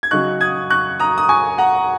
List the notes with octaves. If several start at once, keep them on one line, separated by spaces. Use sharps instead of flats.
G#6
C#3 F#3 D#4 C#6 F#6
D#6 G#6
C#6 F#6
A#5 D#6
D#6
G#5 C#6
F#5 A#5